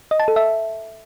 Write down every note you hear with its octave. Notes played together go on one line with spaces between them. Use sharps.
D#5
A5
A4
E5